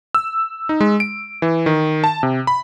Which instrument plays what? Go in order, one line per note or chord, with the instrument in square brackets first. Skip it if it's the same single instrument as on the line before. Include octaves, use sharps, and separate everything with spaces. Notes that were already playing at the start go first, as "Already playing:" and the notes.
[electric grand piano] E6
D#4
G#3
D7
E3
D#3
A5
C3
B5